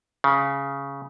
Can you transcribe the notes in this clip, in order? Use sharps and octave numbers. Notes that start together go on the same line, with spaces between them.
C#3